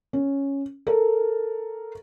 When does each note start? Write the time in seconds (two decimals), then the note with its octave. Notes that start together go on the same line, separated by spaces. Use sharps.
0.13 C#4
0.87 A4 A#4